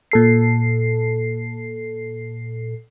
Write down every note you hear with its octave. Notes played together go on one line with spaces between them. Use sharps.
A#2 A4 C7